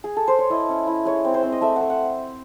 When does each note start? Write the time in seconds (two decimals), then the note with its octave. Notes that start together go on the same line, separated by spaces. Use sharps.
0.04 G#4
0.16 A4
0.28 C5
0.39 C#5
0.50 E4 D#5
0.69 C#4
0.87 E4
1.05 G#3 C#5
1.25 C4
1.34 C5
1.43 C4
1.52 D#5
1.61 A3 E5
1.76 A3 F#5
1.90 F#5